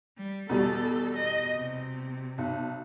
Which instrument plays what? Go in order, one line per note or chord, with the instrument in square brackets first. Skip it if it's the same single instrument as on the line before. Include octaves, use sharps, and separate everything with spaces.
[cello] G3
[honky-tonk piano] E2 B2 G3 [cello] A4
[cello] D#5
C3
[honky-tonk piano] B1